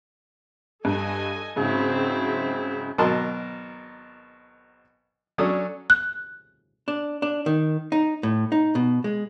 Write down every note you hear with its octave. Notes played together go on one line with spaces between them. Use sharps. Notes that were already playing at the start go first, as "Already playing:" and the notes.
G2 A4 D#5 G#5
G#2 C#3 F#3 C4 E4
G#1 B2 F#3 A#4 A5 C6
F#3 C#4 D4 A4 D#6
F#6
D4
D4
D#3
D#4
A2
D#4
B2
G#3